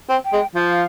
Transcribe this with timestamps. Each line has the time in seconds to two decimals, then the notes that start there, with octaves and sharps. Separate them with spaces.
0.09 C4
0.25 G5
0.33 G#3
0.55 F3 F5